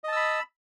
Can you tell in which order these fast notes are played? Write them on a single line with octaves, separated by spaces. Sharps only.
D#5 A5 E6 B5